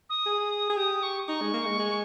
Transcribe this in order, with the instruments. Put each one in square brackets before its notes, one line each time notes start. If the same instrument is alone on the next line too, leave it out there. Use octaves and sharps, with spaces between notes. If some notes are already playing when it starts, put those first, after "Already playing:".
[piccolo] D#6
[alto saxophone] G#4
G#4
[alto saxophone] G4 [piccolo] D#6
[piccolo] C#6
D#6
[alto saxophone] D#4 [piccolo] C#6
[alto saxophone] G#3
A#3
G#3
G#3